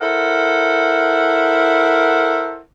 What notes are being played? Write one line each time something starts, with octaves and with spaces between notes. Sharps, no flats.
E4 A4 A#4 C5 F#5